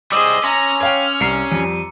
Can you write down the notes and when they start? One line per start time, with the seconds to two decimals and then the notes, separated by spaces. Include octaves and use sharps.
0.12 G3 G#4 C5 D#5 D6 E6 F#7
0.44 C#4 A#5 C6 A#6
0.81 C#5 F5 G5 F6
1.20 C2 A#5 C7 C#7
1.52 F2 G3 D#7